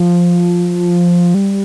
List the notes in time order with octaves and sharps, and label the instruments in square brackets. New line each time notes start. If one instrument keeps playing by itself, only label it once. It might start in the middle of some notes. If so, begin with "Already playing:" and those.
Already playing: [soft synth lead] F3
G3